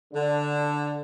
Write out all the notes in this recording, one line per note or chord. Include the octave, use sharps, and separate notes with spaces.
D3